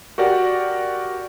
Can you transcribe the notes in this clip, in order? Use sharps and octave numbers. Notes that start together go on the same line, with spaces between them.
F#4 G4 A#4 D5 F#5